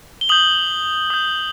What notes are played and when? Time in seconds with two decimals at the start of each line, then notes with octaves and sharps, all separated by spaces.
0.21 G7
0.29 D#6 G6 F#7
1.10 D#6 G6